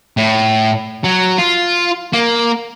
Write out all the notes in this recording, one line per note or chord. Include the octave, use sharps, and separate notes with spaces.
A2
F#3
F4
A#3